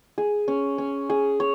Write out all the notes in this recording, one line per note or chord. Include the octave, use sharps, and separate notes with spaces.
G#4
C#4
C#4
G#4
C#5